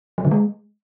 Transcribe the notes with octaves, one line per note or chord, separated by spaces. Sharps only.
F#3
D3
G#3